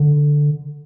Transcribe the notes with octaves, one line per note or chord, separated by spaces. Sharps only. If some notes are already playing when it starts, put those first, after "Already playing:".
Already playing: D3